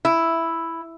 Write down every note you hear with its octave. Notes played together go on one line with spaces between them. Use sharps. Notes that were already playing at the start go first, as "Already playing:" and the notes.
E4